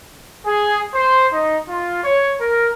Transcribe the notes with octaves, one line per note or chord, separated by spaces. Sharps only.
G#4
C5
D#4
F4
C#5
A#4